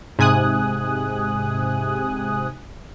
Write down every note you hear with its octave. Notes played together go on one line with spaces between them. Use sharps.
G#2 C3 G#5 D#6 F#6